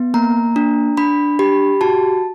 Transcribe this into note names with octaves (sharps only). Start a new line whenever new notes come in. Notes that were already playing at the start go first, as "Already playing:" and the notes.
Already playing: B3
A#3 A#5
D4
D4 B5
G4 B5
F#4 A5